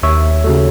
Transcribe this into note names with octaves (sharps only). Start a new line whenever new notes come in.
D#2 C#5 E5
C#3 F#3 A3